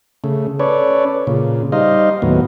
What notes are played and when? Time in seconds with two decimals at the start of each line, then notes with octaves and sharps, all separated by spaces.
0.24 C#3 A3
0.60 C#4 A4 B4 C#5 D5
1.27 A#2 C#3
1.72 G3 D#4 C5 D#5 F5
2.22 D#2 A2 F#3 B3